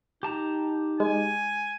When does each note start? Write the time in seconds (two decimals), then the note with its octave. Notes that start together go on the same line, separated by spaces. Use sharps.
0.23 D#4 G4 A5 A#5
1.00 G#3 G#5